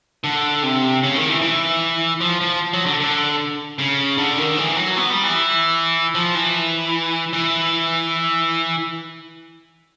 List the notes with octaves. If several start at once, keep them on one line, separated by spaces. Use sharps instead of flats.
D3
C3
C#3
D#3
E3
E3
F3
F3
F#3
D3
D3
C#3
D3
D#3
E3
F#3
B3
G3
E3
F3
E3
E3